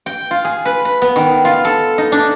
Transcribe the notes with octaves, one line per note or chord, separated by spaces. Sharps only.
G5
F4
G#4
B4
B5
B3
D#3
F4
A4
D#4
D4